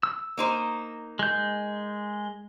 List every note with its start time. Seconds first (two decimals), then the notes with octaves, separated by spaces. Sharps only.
0.03 E6
0.37 A#3 D#4 C5
1.19 G#3 G6